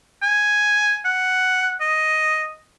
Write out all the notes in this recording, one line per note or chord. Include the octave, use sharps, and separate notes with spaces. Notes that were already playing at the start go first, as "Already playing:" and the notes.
G#5
F#5
D#5